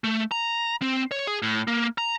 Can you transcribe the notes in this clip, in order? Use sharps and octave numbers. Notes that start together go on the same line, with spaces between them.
A3
A#5
C4
C#5
G#4
A2
A#3
A#5